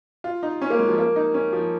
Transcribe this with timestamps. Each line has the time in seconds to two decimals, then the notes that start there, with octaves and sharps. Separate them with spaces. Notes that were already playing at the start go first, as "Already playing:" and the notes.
0.24 F4
0.43 D#4
0.62 C#4
0.70 A#3
0.79 G#3
0.89 F3
0.98 A#3
1.16 D#4
1.34 C#4
1.53 F3